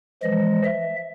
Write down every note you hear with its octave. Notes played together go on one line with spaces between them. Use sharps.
E3 F3 G#3 D#5
E5